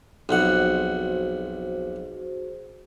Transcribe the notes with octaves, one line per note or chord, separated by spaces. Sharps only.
B1 F2 F#4 G#4 C5 F#5